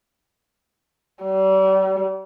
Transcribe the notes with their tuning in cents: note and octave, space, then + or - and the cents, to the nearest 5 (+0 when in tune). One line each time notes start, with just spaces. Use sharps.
G3 -40